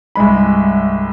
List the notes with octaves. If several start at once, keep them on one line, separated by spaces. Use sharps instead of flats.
C2 G2 G#3 B5